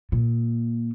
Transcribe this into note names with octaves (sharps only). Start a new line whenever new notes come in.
A#2